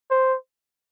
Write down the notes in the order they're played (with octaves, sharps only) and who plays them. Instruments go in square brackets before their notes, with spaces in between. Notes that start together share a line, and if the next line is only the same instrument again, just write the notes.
[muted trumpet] C5